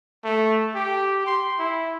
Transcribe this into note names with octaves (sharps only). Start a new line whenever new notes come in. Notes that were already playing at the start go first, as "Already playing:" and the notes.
A3
G4
C6
E4